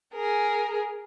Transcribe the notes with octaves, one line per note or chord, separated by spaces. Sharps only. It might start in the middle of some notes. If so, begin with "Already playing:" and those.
G#4 A#4